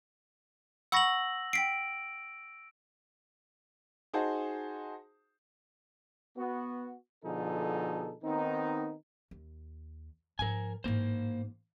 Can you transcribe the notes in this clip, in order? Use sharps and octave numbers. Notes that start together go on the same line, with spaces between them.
F#5 B5 C#6 E6 A#6 F#7
G5 B6 C7 D7
D#4 F#4 G#4 C5 F#5 A5
B3 F#4
B2 D3 F3 D#4 G#4 A4
D#3 B3 C4 D#4
D#2
G#2 F3 A#4 G#5
A1 G#2 A#3 C5